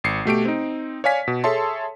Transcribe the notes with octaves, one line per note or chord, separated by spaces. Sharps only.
G#1 C7 C#7
B2 A3 G4 D7
C4 D#4
C#5 D5 F5 G#5 B6
B2
G#4 A4 C#5 E5 A5 C6